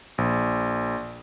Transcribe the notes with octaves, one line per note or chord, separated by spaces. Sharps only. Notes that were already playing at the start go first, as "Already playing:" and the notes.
A#1